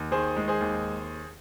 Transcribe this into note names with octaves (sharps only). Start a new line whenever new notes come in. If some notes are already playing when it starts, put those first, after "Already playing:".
Already playing: D#2
D#3 G#4 C5
G#3
G#4 C5
D#2